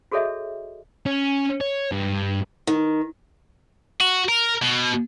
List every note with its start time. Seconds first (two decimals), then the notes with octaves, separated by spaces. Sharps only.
0.12 F#4 G#4 A4 C#5 D#5 E5
1.06 C#4
1.61 C#5
1.92 G2
2.67 D#3
4.01 F#4
4.29 A#4
4.62 B2